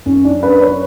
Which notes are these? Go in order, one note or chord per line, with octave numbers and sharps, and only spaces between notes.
F#2 C#4
D4
B4
C#5